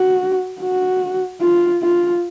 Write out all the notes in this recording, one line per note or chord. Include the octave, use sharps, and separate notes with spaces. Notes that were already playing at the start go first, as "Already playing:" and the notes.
Already playing: F#4
F#4
F4
F4